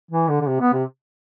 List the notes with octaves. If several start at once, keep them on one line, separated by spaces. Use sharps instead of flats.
E3
D3
D3
C3
B3
C3